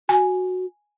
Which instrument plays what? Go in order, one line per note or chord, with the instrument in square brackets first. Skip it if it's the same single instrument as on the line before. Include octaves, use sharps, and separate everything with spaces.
[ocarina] F#4 [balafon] G#5